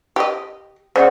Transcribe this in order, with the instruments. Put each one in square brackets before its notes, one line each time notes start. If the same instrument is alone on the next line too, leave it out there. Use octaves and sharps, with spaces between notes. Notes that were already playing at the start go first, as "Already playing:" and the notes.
[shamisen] G4 D#5
[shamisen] C#3 [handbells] C5 D5 F#5